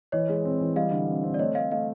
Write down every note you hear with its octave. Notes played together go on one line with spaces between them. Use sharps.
E3 C#5 D#5
G#3
C4
E3
G3 D#5 F5
D3
C4
C4
D5
A3 C#5 D#5
A3 D#5 F5
A3 D#5 F5